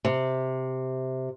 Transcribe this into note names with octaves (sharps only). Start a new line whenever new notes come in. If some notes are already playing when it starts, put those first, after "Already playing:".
C3